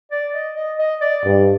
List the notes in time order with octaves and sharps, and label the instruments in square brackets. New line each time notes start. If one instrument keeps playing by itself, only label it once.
[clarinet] D5
D#5
D#5
D#5
D5
[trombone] G2